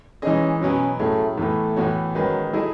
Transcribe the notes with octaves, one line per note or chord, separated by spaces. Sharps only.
E3 G#3 C#4 D#4 G#4 D#5
B2 F#3 B3 C#4
A2 F#3 A3 C#4 G#4
A2 E3 A3 B3
A2 E3 B3 F#4 C#5
D#3 F#3 G#3 C#4 G#4 B4
F#3 A3 E4 G#4 D#5